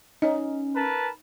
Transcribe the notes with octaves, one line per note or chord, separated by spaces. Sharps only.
C#4 D#4 C#5 D#5
A#4 B4 A5